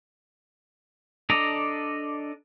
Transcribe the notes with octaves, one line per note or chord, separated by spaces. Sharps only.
D4 A4 D5 D#5 A#5